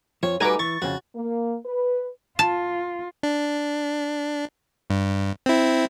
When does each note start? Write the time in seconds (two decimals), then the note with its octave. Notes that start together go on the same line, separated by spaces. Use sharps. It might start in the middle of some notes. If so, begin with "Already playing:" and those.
0.23 F2 F3 C#5
0.40 G3 A3 D#4 F#4 B4 G#5 A#5 D6
0.59 E3 C#6 A6
0.82 F2 C#3 F#4
1.15 A#3
1.65 B4
2.39 F4 A5
3.23 D4
4.90 G2
5.46 C4 E4